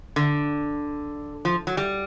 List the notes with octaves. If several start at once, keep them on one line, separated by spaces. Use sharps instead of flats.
D3
F3
F#3
G3